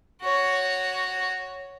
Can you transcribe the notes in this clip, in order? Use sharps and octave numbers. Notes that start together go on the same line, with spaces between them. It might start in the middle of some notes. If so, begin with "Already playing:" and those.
F#4 C#5